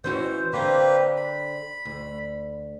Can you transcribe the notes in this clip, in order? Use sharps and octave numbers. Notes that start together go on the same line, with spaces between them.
E3 C#4 F#4 C5
D3 A#3 C4 G4 B4
B5
D2